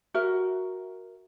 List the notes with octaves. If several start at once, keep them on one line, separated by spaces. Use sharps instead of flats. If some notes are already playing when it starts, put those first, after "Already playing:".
F#4 A#4 E5